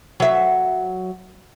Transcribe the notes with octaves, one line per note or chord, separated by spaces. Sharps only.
F#3 E5